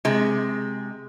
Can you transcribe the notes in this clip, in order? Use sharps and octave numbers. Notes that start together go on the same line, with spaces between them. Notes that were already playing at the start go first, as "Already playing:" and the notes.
C3 G#3